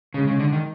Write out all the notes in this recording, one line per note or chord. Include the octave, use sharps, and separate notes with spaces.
C#3 G#3
C#3
D3
D#3